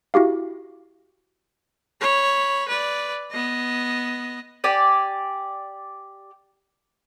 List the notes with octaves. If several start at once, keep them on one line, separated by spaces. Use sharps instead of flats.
E4 F#4 G4 F5
C#5 B5
B4 D5
B3 D#5
G4 D5 G#5